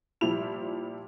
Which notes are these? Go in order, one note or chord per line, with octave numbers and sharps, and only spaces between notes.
A#2 F3 G3 E4 F7